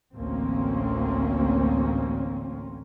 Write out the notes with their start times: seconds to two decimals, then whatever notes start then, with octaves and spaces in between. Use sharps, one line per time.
0.14 A1 D2 A#3 C4 C#4